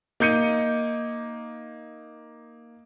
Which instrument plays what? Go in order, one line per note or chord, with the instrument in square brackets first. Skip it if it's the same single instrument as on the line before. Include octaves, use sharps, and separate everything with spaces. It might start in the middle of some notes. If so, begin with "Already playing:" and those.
[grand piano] A#3 D#4 G6 C#7 D#7